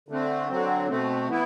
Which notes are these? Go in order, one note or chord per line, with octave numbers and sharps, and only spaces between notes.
D3 A3 C4
D3 F#3 C4
B2 A3 C4
E3 B3 E4